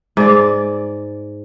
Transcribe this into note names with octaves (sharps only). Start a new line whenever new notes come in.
G#2 D5